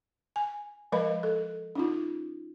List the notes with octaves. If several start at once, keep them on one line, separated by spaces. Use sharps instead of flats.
G#5
F3 G#3 A#4 B4 D#5 B5
A4
C#4 D#4 F4